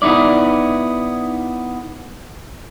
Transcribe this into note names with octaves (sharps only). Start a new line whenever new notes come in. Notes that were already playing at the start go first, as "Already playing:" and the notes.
B3 D#4 E4 D5